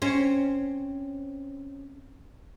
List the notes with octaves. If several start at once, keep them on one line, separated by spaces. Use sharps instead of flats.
C4 C#4